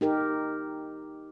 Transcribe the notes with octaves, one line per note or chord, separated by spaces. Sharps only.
D#4 G4 A#4